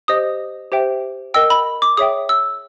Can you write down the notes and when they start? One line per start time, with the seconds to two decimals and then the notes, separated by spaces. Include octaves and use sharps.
0.08 G4 C5 D#5 D#6
0.72 G4 C5 E5 G5
1.34 A#4 D#5 G5 E6
1.50 B5
1.82 D6
1.97 G#4 C#5 E5 G5 D#6
2.29 E6